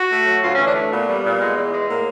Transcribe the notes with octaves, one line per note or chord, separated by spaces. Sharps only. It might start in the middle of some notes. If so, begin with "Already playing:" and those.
Already playing: F#4
A3
F#3
D2 F4
E3 C#4
D4
A3
A#2 B3
G3
A#2
G#3
E2
G#3
A2 A#3